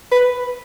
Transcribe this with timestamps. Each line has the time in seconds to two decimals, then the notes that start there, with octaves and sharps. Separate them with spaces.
0.12 B4